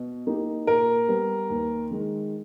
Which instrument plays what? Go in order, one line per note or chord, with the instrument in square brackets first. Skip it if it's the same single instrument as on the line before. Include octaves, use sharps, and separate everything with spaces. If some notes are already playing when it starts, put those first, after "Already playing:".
Already playing: [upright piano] B2
A#3 D#4 G4
[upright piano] A#2 [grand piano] A#4
[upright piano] G3 B3
D#2
D#3 G#3